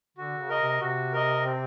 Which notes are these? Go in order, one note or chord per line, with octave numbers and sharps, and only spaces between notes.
D3 F#4
C#3
A#4 D#5
C3
C3 F#4
A#4 D#5
C4